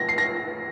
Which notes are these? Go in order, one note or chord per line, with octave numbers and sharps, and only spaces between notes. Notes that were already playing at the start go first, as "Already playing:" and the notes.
Already playing: A#6
C7
A#6